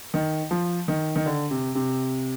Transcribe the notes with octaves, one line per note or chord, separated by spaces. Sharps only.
D#3
F3
D#3
D#3
D3
C3
C3